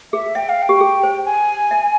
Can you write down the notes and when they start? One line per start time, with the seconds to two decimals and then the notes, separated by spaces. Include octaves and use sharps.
0.13 G#4 E5
0.35 E5 G5
0.49 F5
0.62 G5
0.69 G4
0.81 G#4
1.03 C5
1.26 G#5
1.71 E5